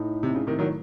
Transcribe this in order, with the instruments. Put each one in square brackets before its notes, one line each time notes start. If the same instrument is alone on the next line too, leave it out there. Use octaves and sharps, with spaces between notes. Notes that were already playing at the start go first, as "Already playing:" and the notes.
Already playing: [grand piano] A2 A3 D#4
[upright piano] C3
C#3
C3 D#3
D#3 F#3